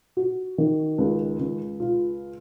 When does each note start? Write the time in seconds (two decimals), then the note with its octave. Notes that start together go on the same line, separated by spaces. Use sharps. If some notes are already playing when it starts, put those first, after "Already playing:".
0.17 F#4
0.58 D#3
0.98 C#2
1.39 C#2
1.80 F4